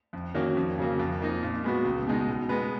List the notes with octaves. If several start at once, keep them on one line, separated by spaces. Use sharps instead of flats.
F2
D#3 A#3 C#4 F#4
F2
C#3 F#3 A#3
F2
F3 A#3 D#4
A#2
G#3 B3 F#4
C#2
B2 G#3 D#4
B2
G#3 B3